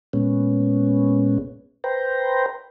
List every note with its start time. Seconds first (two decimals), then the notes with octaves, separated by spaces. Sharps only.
0.13 A#2 G#3 B3 C#4
1.84 B4 C5 G5 A#5